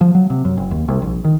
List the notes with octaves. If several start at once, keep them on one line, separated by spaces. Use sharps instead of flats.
F3
F#3
C3
F#2
F#1
D#2
C2
A#1
D#3